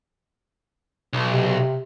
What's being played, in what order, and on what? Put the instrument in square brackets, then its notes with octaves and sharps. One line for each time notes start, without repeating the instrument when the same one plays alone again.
[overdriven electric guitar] B1
[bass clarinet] C3
C3